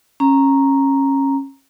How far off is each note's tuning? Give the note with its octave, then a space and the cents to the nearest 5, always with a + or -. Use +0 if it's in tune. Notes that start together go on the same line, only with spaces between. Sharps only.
C#4 -25 A#5 +0